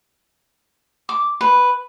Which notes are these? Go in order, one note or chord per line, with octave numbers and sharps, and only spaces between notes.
D6
B4